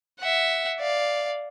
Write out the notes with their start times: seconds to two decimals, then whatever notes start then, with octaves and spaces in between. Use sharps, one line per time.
0.19 E5 F#5
0.80 D5 F5